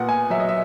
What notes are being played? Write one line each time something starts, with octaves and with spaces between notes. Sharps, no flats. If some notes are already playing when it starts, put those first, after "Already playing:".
Already playing: A#2 B3 F#5
G#5
F#3 E5
D#5
E5